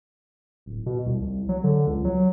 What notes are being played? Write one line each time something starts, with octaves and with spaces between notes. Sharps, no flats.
D1
B2
C2
C2
F#3
D3
C#2
F#3